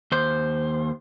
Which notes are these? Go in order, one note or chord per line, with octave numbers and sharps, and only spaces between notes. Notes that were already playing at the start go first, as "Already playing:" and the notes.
D#2 C5